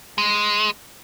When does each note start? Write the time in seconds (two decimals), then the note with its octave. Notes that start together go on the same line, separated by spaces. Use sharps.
0.18 G#3